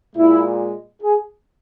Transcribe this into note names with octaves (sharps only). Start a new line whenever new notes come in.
A#2 G#3 E4
G#4